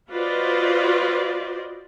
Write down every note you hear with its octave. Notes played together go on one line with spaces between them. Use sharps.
F4 F#4 B4 C5 D5 D#5